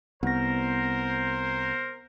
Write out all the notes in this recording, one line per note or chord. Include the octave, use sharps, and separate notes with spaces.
C2 B3 A#4 C5 A#6